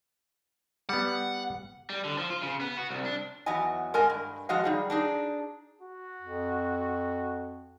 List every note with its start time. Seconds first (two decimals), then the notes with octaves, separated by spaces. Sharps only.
0.89 G3 B3 F#5
1.90 G3
2.05 D3
2.18 F3
2.30 F4
2.42 C#3
2.61 B3
2.77 F#4
2.90 C2
3.05 D4
3.46 E2 F#3 B3 D#5 G#5
3.94 G#3 A#4 D#5 G#5
4.10 G2
4.49 F3 G#3 F#4 D#5 F5
4.64 G3 D#4 G#4
4.90 D4 D#4 G#4
5.81 F#4
6.22 F2